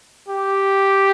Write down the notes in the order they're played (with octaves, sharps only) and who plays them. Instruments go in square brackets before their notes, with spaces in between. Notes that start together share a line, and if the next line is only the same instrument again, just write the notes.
[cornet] G4